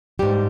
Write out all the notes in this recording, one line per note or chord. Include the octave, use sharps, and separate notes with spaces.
G#2 G3 G4